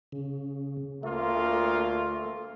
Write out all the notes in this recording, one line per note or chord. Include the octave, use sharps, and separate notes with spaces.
C#3
D2 A3 A#3 F4